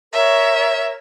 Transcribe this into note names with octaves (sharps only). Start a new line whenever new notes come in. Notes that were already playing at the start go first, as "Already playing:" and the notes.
A#4 C#5 E5